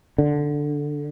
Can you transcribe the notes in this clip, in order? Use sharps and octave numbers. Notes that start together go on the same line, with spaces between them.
D3